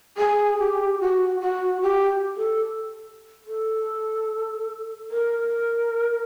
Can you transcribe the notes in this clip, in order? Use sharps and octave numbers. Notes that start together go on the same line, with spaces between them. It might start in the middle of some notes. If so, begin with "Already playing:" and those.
G#4
G4
F#4
F#4
G4
A4
A4
A#4